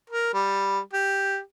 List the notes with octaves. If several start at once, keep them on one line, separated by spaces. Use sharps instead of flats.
A#4
G3
G4